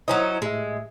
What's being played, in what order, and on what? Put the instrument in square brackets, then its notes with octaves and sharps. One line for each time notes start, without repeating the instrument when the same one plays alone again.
[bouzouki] F#3 C#4 D#4 [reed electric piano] E4 C5 D#5
[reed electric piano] A2 E5 [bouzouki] G#3